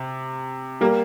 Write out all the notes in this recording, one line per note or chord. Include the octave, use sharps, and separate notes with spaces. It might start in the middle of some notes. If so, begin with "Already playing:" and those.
Already playing: C3
G3 A#3